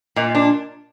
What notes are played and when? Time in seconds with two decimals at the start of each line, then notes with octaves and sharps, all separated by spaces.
0.16 A#2 D#5
0.30 D4 D#5